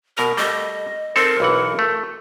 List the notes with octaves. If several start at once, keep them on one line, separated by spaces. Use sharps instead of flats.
B2 A#4 A#5
G3 A3 D#5
C4 D#4 A4 A#4
B1 E3 F#5
A3